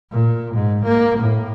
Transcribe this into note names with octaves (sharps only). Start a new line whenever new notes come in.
A#2
G#2
A#3
A2